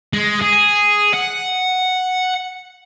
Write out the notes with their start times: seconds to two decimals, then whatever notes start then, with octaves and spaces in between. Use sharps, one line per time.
0.13 G#3
0.42 G#4
1.14 F#5